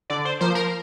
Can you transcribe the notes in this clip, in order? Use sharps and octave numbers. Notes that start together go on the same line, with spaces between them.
D3 D5
C5
F3 A#3 C5
A#4